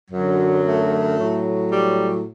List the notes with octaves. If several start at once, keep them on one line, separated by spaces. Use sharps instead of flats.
F#2 D3 F#3
A3
A2 F#3
G3